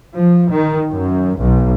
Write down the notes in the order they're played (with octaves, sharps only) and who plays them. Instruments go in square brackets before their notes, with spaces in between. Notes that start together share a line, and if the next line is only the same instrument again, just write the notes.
[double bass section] F3
D#3
F#2
B1